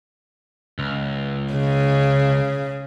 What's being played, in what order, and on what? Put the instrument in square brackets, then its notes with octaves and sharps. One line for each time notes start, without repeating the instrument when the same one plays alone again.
[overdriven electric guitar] C#2
[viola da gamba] C#3